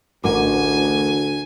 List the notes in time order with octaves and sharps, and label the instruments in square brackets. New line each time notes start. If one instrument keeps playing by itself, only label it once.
[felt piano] A1 A#4 D6 [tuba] D2 [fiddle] G#5